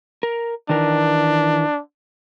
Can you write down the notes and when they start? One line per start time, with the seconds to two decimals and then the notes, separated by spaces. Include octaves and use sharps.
0.23 A#4
0.69 D#3 E3 D4 A#4